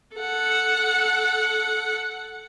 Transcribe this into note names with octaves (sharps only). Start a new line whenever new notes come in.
A4 F#5